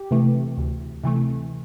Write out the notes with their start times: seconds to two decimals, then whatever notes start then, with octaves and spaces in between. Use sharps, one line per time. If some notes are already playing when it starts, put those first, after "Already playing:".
Already playing: G4
0.11 C3 E3 A3
0.57 D2
1.04 C3 E3 A3